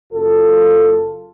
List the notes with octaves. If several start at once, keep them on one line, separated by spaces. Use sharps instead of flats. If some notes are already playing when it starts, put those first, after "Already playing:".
F#1 F4 A4